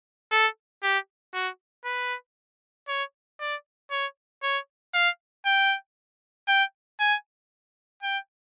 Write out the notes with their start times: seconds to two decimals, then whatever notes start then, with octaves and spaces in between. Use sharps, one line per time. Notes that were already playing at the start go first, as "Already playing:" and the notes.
0.32 A4
0.83 G4
1.34 F#4
1.85 B4
2.88 C#5
3.40 D5
3.91 C#5
4.43 C#5
4.94 F5
5.45 G5
6.48 G5
7.00 G#5
8.03 G5